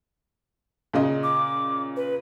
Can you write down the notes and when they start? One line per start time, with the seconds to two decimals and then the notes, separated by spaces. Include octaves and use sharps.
0.93 A#2 C#3 D#5
1.23 D6
1.97 B4